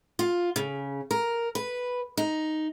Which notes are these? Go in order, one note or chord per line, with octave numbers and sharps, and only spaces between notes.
F4
C#3
A#4
B4
D#4